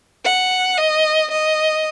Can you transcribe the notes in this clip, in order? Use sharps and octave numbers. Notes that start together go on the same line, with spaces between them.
F#5
D#5
D#5